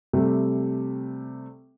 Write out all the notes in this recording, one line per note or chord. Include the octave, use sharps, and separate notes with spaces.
C3 G3 A3